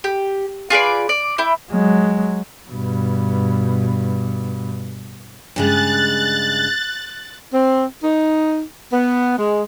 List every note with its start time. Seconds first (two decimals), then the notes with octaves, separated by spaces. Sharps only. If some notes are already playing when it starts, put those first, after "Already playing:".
0.04 G4
0.70 F4 G#4 B4 D5
1.09 D5
1.38 E4 G5
1.71 F#3 G#3
2.68 G2 B2
5.56 G2 C#3 G#3 F#6 A6
7.53 C4
8.03 D#4
8.92 B3
9.38 G#3